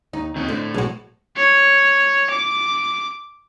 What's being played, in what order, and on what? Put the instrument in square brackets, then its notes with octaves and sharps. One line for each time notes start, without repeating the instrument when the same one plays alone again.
[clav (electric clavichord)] D#2 [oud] D#4
[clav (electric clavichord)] D#2 [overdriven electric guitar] C4 D#5
[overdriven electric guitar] A2 [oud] D3 [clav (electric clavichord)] C5
[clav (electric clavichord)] B1 [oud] G#3 F#4
[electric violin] C#5
D6